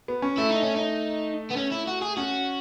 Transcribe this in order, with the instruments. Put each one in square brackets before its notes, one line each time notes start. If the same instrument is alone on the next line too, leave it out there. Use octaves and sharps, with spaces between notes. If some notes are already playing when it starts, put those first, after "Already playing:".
[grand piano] B3
C#4
[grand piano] A3 [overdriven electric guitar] E4
[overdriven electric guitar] D#4
C#4
D#4
B3
C#4
E4
F#4
G#4
[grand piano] C#4 [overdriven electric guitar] F#4